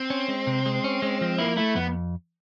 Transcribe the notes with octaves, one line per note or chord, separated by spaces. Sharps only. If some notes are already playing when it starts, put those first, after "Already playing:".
Already playing: C4
C#4
G#3
C3
G#3
C#4
G#3
F3
A#3 E4
A3 E4
F2 B3